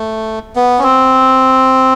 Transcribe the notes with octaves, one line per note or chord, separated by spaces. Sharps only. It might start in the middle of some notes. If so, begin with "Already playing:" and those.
Already playing: A3
B3
C#4
C4